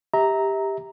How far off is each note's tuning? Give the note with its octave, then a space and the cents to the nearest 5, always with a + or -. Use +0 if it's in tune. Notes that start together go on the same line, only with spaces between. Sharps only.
G4 +10 E5 -30 A#5 +0